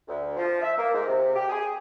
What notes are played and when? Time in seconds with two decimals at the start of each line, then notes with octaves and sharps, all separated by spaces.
0.08 D2
0.37 F3
0.62 E5
0.78 A#3
0.93 G#2
1.07 C3
1.35 G4
1.49 G#4